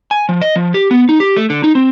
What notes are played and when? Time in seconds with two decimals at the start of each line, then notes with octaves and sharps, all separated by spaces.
0.11 G#5
0.29 F3
0.42 D#5
0.56 F3
0.74 G4
0.91 B3
1.09 D#4
1.20 G4
1.37 A3
1.50 D3
1.64 D#4
1.75 C4